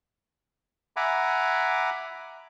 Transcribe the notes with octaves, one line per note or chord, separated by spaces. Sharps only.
E5 F#5 G#5 A#5 B5 D6